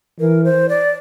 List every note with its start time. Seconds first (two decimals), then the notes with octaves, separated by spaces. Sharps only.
0.20 E3 A#4
0.45 C5
0.69 D5